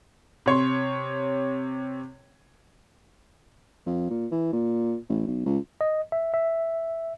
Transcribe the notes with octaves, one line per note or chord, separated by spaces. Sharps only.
C3 C#5 C6
F2
A#2
E3
A#2
A1
B1
C#2
D#5
E5
E5